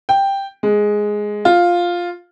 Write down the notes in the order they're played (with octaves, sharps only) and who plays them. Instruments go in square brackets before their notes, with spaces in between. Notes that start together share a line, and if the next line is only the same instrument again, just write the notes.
[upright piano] G5
G#3
F4